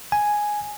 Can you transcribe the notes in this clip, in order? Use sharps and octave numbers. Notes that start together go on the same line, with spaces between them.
G#5